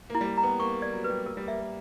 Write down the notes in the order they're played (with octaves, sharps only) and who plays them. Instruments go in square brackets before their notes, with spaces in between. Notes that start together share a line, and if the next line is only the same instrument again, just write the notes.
[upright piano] A#3
[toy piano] E4
[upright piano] G3
A#3
[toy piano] A#5
[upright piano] B3
[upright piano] A#3 [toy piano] C#6
[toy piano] D5
[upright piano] F#3
[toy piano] B4
[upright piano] G3
[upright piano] A#3 [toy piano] A#4
[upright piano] G3
[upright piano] A#3 [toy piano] E5
[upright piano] A#3